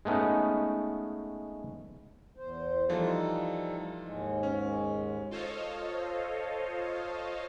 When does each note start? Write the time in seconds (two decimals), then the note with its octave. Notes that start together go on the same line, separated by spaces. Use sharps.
0.05 G#3 A3 B3 C#4 D#4
2.36 E2 C5
2.89 E3 F3 G3 D#4 F4 A4
4.04 D#2 G#2 G#3
4.43 C#4
5.31 F4 A4 C5 C#5 D#5 F5